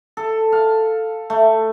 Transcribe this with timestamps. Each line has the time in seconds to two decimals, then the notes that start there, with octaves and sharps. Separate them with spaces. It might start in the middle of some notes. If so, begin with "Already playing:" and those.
0.17 A4
0.52 F5
1.30 A3